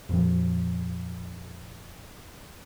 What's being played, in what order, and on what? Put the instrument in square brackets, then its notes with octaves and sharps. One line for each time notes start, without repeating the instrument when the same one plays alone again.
[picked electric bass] F2 A#2 F3